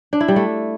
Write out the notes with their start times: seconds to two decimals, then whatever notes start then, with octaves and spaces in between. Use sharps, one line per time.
0.13 D4
0.20 E4
0.28 G3
0.36 A3